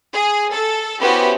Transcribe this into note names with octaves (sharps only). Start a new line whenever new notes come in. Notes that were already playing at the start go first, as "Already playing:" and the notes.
G#4
A4
B3 C#4 E4 F#4 G4 C5